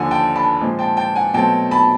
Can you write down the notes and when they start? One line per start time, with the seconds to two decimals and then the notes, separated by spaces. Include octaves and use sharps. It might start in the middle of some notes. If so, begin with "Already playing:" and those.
Already playing: D#2 D3 F3 F#5 G#5
0.11 G5 A5
0.36 A5 B5
0.60 A#2 F3 G#3 C4
0.79 G5 A5
0.97 G5 A5
1.16 F#5 G#5
1.34 B2 F#3 A3 C4 G5 A5
1.71 A5 B5